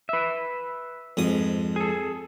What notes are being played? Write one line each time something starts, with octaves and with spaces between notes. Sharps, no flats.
B4 E5
F2 G#2 D#6
G#4 A4